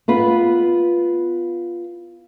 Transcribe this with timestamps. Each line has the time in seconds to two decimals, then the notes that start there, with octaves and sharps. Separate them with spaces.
0.08 B3 F4 B4